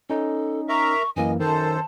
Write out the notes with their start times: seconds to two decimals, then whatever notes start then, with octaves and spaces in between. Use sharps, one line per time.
0.10 C#4 D#4 A4
0.69 A#4 E5 A#5 C#6
1.16 F#2 E3 A#3 D#5 G#5
1.40 F#2 D#3 A4 C5 A5